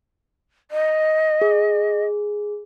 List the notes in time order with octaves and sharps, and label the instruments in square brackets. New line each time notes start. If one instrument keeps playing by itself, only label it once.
[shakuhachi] D#5
[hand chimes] G#4